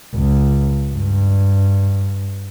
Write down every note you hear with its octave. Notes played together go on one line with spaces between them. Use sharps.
C#2
G2